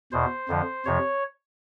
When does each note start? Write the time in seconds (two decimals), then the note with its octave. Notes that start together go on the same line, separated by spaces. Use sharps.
0.12 E2 B2 C5
0.49 F2 D3 F3
0.85 F2 C3 F3 C#5